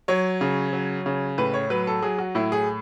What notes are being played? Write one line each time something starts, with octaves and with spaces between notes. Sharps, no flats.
F#3 C#5
C#3
F#3
C#3
A2 B4
C#5
F#3 B4
A4
F#3 G#4
F#4
A2 E4
G#4